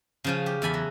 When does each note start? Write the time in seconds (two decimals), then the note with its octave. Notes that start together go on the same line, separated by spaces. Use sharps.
0.24 C#3 F3 C#4
0.46 G4
0.62 E2 A4 G#5 B5
0.74 F#3